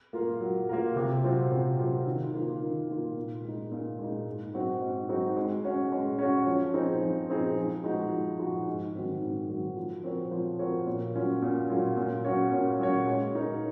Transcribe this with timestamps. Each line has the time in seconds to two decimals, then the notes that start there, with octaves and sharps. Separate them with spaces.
0.13 A#3 F4 A#4
0.41 F#3
0.69 A#3 F4 A#4
0.96 C3
1.24 F#3 C4 F4
1.52 C3
1.79 F#3 C4 F4
2.06 D#3
2.34 A#3 F4
2.62 D#3
2.89 A#3 F4
3.17 A#2
3.43 G#3
3.48 D#4
3.72 A#2
3.99 G#3 D#4
4.26 G#2
4.54 F#3 C4 D#4 F#4
4.81 G#2
5.09 F#3 C4 D#4 F#4
5.37 G#3
5.65 C#4 F#4 C#5
5.92 G#3
6.19 C#4 F#4 C#5
6.47 F3
6.74 C4 D#4 G#4
7.02 F3
7.30 C4 D#4 G#4
7.57 F3
7.84 G#3 D#4 F#4
8.12 F3
8.39 G#3 D#4 F#4
8.66 G#2
8.95 D#3 F#3 C4 F#4
9.22 G#2
9.49 D#3 F#3 C4 F#4
9.76 F3
10.04 C4 F#4 A#4 C#5
10.31 F3
10.59 C4 F#4 A#4 C#5
10.87 A#2
11.15 F#3 C#4 F4
11.42 A#2
11.70 F#3 C#4 F4
11.97 A#2
12.25 F#3 C#4 F#4 C#5
12.52 A#2
12.79 F#3 C#4 F#4 C#5
13.07 G#3
13.35 D#4 A#4 C#5